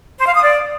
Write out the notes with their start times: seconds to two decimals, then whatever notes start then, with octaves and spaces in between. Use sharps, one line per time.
0.19 C5
0.26 F5
0.34 D#6
0.42 D5